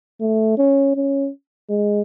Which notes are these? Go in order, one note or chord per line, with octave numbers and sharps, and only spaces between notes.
A3
C#4
C#4
G#3